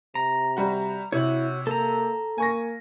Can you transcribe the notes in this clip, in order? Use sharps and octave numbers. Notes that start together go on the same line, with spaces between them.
C3 A#5
G3 F#4
C3 E4 F#4 C#5
A#3 A4 A#5
A#3 G#5 C#6 A#6